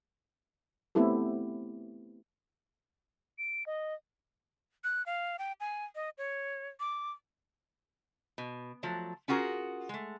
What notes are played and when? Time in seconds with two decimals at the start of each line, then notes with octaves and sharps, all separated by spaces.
0.95 A3 B3 C4 E4 G4 A4
3.38 D7
3.66 D#5
4.84 F#6
5.06 F5
5.39 G5
5.60 G#5
5.95 D#5
6.18 C#5
6.80 D6
8.38 B2
8.83 F3 F#3 A3
9.28 C#4 F4 F#4 G#4 A#4
9.89 G#3 A3